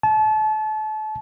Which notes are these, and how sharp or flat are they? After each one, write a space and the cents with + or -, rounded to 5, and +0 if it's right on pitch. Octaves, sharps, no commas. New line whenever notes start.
A5 -30